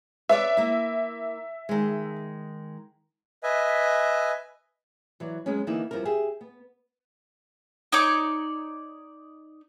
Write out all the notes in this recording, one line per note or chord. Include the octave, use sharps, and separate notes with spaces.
B4 C#5 D5 E5
A#3 E4
D#3 G#3
B4 D#5 E5 G#5
E3 F#3 D5
F#3 G#3 B3 C#4
D3 E3 A#3 B3 D#4 E4
G2 F3 B3 E4 A#4
G4 G#4 E5
B3
D#4 C#5 D5 D6